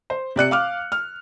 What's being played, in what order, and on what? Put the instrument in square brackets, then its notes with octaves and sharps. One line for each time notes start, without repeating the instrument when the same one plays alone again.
[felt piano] C5
C3 D5 F#6 C#7
F5 D6 F6
F6